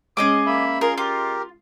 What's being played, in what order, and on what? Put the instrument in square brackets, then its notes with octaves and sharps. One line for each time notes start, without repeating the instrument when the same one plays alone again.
[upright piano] G#3 C#4 [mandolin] G#4 D#5 D6 [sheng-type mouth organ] D#6
[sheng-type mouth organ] A#3 E5 B5
[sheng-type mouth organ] F4 G#4 C6 [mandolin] A#4
[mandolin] F4 [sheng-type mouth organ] G4 A#4